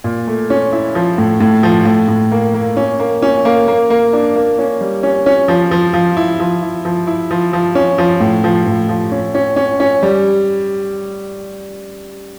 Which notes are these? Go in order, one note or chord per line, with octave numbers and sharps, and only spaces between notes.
A#2
A3
C#4
E4
F3
A2
A2
F3
A2
A2
A#3
A#3
C#4
A#3
C#4
A#3
A#3
A#3
D4
A#3
C#4
G3
C#4
C#4
F3
F3
F3
E4
F3
E4
F3
E4
F3
F3
C#4
F3
A2
F3
A2
F3
C#4
C#4
C#4
C#4
G3